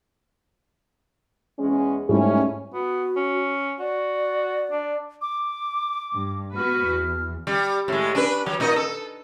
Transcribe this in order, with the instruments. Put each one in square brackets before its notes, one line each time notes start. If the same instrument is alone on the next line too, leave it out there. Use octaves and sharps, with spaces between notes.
[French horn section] E2 G#3 C#4
[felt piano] G#2 G3 A3 [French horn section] C#4 E4
[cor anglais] B3 [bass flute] F#4
[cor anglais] C#4
[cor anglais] F#4 [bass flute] D5
[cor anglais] D4
[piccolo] D6
[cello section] G2
[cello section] B3 F#4 B4 [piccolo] F6
[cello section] E2
[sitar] G3
A2 G#3
D4 B4
F#3
A#2 D#4 D#5
A4